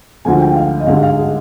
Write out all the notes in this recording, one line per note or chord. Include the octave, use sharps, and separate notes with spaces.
D2 D3 F3 G#3 G#5
G5
F5
D#5
G#1 G2 D3 G#3 F5
F5
G#4